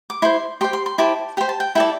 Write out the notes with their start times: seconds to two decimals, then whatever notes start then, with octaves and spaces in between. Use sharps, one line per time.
0.10 D6
0.22 E4 C5 C6
0.61 G4 C6
0.64 C5
0.73 C6
0.86 C6
0.98 E4 G4 C5 A5
1.37 G4 C5 G5
1.49 A5
1.60 G5
1.75 E4 A4 D5 G5